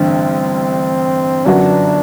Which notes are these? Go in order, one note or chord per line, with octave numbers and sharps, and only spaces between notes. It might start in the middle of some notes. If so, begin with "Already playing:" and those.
Already playing: A1 G2 D3 C4
G1 F#2 F#3 B3 D4 F#4